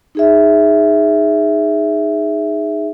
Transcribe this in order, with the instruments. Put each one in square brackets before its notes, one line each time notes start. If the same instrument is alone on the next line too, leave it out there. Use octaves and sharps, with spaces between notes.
[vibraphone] D#4 G#4 E5